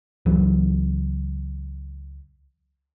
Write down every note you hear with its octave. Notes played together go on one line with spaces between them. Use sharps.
C#2 E3 F#3